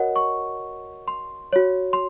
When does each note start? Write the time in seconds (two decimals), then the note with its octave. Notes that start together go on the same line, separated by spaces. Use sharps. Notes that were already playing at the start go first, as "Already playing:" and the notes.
Already playing: F#4 A#4 C#5 D#5 F#5
0.16 C#6
1.08 C6
1.53 F#4 C#5
1.93 C6